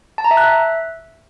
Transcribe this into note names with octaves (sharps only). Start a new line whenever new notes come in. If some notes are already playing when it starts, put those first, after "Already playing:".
A5
A#5
E5
F#6
E5